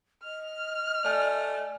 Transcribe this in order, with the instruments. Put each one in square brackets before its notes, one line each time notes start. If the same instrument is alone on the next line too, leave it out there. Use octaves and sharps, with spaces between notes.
[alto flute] D#5 [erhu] F6
[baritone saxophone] A3 [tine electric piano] D5 G#5